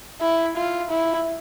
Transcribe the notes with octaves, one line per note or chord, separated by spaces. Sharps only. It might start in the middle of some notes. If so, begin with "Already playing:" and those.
E4
F4
E4